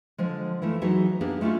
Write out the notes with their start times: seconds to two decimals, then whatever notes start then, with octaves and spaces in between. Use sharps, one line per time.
0.18 D3 F3 G#3
0.62 E3 F3 A3 E4
0.82 E3 F#3 D#4 F#4 G#4 E5
1.21 A#3 B3 D4 G4 G#4
1.41 G#3 A3 C#4 E4 F4